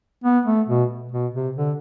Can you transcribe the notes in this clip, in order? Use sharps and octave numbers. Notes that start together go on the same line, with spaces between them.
B3
A3
B2
B2
C3
D3